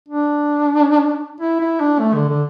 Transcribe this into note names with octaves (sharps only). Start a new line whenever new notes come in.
D4
E4
E4
D4
A3
D3
D3